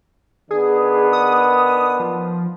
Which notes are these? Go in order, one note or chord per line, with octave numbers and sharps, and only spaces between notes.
D#3 B3 D4 G#4
D#6
F3